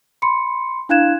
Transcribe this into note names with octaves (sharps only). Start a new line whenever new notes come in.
B5 C6 C#7
D4 E4 F5 F#6 G#6 E7